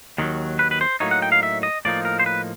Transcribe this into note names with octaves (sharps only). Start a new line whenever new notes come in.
D#2 D#3 F#3
B4
B4
C5
A2 F#3 A#3 D#4 C#5
F#5
G5
F5
E5
D#5
A2 F3 A#3 D#4 D5
A#4
C5
B4